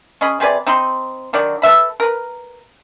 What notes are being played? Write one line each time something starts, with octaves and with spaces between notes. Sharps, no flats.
C#4 G#4 D#5 B5
C3 G#4 B4 D5
C4 D#4 B5 C6
D3 D#3 F#3 D5
A4 B4 E5 B5
A#4 B4